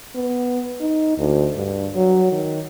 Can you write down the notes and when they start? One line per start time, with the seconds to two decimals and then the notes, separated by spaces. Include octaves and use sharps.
0.15 B3
0.80 D#4
1.18 D2
1.56 G2
1.95 F#3
2.32 D#3